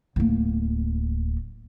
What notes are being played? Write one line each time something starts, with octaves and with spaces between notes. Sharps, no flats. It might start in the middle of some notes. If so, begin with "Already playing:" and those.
D1 A#3